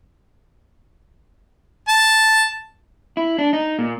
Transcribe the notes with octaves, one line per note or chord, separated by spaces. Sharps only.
A5
E4
D4
D#4
A#2